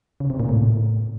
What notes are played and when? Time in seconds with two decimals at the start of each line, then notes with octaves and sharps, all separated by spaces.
0.20 C#3
0.30 C3
0.40 A#2
0.49 A2